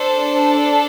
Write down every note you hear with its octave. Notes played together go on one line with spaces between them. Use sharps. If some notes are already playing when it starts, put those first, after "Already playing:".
Already playing: D4 A4 C5